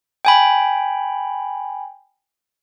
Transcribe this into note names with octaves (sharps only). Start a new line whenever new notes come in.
G5 G#5 B5